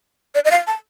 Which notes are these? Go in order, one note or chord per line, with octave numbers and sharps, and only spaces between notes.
D5
D#5
F5
A5